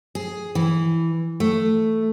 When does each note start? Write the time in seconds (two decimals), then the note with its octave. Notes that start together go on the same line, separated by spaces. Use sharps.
0.15 G#4
0.55 E3
1.40 A3